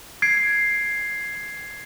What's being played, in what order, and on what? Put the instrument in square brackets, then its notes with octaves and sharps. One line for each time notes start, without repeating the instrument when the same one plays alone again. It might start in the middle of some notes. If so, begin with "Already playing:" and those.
[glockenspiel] G#6 C7 D7